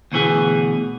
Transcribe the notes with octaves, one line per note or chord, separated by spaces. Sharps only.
D2 B2 E3 G#4